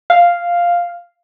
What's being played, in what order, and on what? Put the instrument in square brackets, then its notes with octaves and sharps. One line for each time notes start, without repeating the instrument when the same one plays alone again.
[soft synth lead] F5